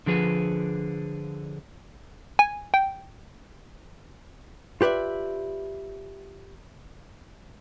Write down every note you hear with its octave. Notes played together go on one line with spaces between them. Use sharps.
D3 F3 G#4 B4
G#5
G5
F4 G4 B4 D5 E5